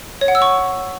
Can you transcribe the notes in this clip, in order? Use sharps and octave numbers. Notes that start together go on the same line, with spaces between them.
C#5
F#5
E6
C#6